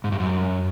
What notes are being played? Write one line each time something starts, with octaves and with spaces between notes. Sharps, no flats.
G#2
G2
F#2